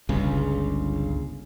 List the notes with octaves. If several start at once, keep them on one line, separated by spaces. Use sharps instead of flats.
G1 C#2 C#3